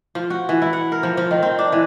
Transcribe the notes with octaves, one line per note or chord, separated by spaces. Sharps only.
F3
F#4
E3
E4
F#5
A#4
F3
F3
D#3
C4
D4
E3